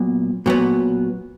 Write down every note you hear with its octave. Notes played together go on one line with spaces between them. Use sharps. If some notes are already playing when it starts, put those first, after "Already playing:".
Already playing: A#2 F#3 B3
A#2 F#3 B3